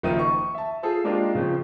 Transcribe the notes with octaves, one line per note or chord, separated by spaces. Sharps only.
F#1 D#3 F3 E5 D#6 D#7
C#6
E5 A5
F4 G#4 A4 C5
G#3 A#3 D4 D#4 F4 G4
C#3 F3 C4